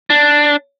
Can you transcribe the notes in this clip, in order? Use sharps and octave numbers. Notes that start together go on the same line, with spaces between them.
D4